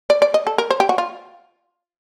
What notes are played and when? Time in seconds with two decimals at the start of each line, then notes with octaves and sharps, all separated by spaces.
0.10 D5
0.22 D5
0.34 D#5
0.47 A4
0.58 A#4
0.71 C5
0.80 G4
0.89 F#4
0.98 F4